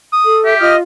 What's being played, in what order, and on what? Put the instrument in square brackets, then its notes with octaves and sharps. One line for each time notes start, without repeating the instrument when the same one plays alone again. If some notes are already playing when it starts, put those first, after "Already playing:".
[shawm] D#6
[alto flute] A4
[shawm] G4 [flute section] E5
[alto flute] F4 [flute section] D#5 D#6 F6